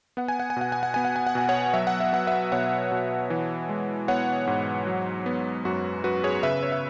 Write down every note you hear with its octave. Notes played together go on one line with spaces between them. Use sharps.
B3 F#5
G#5
F#5
G#5
B2 F#5
G#5
F#5
B3 G#5
F#5
G#5
F#5
B2 G#5
C#5 F#5
F#3 E5
F#5
E5
B3 F#5
B4 E5
B2 C#5 F#5
B2
E3
G#3
B3 C#5 F#5
G#2
F#3
B3
F#2 F#4
F#2 F#4 B4
G#4 C#5
C#3 B4 E5
C#5
E5